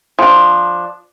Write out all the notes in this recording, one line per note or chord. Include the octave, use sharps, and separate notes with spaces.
F3 D4